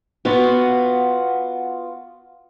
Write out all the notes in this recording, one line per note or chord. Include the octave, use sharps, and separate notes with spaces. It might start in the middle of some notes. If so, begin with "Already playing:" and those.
B3 F4 F#4